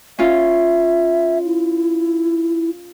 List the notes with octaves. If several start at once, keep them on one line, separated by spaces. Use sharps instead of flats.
C#4 F4 E5
E4